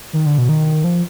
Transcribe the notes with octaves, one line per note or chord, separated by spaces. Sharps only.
D#3
D3
B2
D#3
F3